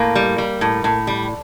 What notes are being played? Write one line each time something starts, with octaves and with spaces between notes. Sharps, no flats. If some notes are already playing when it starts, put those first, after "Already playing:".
Already playing: A2 A#3
G3
G3
A2
A2
G3